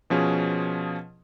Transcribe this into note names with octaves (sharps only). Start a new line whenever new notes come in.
B2 F3 C#4 G#4